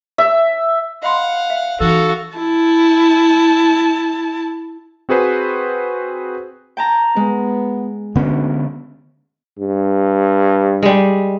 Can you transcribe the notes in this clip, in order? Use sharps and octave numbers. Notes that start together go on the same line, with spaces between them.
E5
D#5 F5 F#5 B5 C6
E5
E3 D#4 F#4 A4 F5
E4 A5
C4 F#4 G#4 B4 C5
G5 A5 A#5
G#3 B3
D2 D3 B3 C#4
G2
G3 G#3